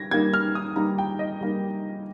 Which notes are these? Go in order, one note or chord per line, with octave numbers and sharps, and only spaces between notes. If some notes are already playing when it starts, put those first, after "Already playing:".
Already playing: G3 G#6 A#6
G3 A#3 D#4 G#6
F6
D#6
G3 A#3 D#4 A#5
G5
D#5
G3 A#3 D#4